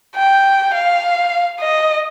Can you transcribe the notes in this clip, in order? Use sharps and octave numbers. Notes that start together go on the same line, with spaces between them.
G5
F5
D#5